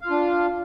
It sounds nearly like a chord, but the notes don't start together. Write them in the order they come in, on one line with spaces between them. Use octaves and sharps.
F5 F4 D4